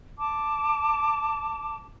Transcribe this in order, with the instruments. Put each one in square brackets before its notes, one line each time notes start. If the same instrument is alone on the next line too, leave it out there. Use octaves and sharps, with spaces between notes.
[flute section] A5 D6